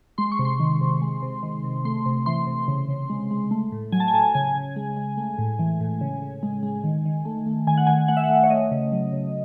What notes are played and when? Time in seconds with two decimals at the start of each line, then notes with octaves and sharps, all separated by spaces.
0.18 G#3 C6
0.32 C#6
0.39 C3
0.45 C6
0.60 D#3
0.81 C3
1.02 G#3
1.22 C3
1.43 D#3
1.64 C3
1.85 A3 C6
2.06 C3
2.26 E3 C6
2.47 C3
2.68 C#3
2.88 C#3
3.10 G#3
3.31 G#3
3.51 A3
3.72 A2
3.92 F#3 G#5
4.00 A5
4.08 G#5
4.13 A2 A5
4.23 G#5
4.34 C#3 G#5
4.55 C#3
4.76 G#3
4.97 G#3
5.17 A3
5.38 A2
5.59 E3
5.80 A2
6.01 C#3
6.22 C#3
6.43 G#3
6.63 G#3
6.84 D#3
7.05 D#3
7.25 A3
7.46 A3
7.67 D#3 G#5
7.77 F#5
7.87 D#3 G#5
8.08 A3 F#5
8.17 E5
8.24 F#5
8.29 A3
8.43 C#5
8.50 A3 D#5
8.71 C#3
8.92 F#3
9.12 C#3